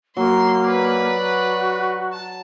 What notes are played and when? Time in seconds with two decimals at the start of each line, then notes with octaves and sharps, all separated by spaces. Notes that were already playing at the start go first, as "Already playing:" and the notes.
0.17 F#3 A#3 C6
0.66 B4 D5
1.15 F#4
2.13 A5